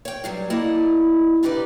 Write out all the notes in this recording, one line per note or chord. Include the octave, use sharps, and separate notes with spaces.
C#5 G5
G2 F#3 G3
A#3 E4 A4 D5 D#5
D4 D#4 G4 B4 D5